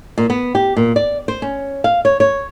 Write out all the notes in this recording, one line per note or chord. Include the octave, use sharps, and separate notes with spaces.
A#2
B3
G4
A#2
D5
C5
C#4
F5
C#5
C#5